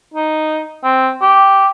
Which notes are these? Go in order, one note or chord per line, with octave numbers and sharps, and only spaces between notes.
D#4
C4
G4